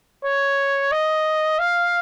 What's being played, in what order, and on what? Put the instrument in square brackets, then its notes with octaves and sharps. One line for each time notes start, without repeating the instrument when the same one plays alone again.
[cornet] C#5
D#5
F5